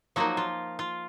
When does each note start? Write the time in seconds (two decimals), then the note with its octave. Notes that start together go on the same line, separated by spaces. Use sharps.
0.16 F3 F#3 A#3 D#4 F#4
0.37 F4
0.79 F4